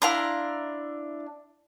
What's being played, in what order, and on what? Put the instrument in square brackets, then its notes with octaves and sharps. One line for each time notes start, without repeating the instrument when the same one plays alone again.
[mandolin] D4 E4 [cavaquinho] F5 A#5 C6